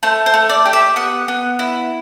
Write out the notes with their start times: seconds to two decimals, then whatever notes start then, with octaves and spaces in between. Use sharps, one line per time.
0.03 A3 C5
0.26 C5
0.34 A3
0.49 D5
0.66 G4
0.73 E5
0.96 B3 F#5
1.28 B3
1.59 E4